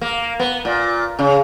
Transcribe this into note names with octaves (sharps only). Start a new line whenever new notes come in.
A#3
B3
A#2
C#3